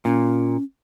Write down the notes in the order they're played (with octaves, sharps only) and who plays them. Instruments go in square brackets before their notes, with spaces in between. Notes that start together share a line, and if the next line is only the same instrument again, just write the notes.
[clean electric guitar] A#2 [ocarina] C#4